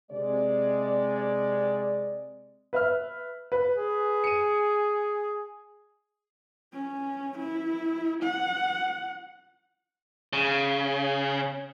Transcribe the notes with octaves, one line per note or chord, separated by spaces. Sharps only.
C3 G#3 D5
B4 E5 F6
B4
G#4
C#7 D#7
C#4
E4
F#5
C#3